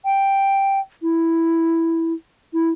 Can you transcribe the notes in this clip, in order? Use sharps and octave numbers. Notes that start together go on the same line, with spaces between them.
G5
E4
E4